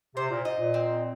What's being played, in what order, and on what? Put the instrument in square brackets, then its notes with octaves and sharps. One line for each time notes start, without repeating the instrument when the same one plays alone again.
[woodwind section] C3 [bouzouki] C5
[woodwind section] A#2
[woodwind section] G#2 [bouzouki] D#5
[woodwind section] A#2
[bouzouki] C4